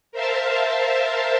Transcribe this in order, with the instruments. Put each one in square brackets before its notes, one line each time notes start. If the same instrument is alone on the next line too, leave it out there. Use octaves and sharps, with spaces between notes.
[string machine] A#4 C5 E5 F5 A5